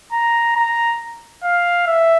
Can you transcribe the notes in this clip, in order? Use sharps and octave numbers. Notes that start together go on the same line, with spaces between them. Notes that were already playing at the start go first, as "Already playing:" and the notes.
A#5
A#5
F5
E5